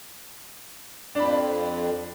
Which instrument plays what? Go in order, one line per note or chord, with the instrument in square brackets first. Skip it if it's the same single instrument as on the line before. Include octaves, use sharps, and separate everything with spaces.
[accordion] F2 [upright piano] D4 B5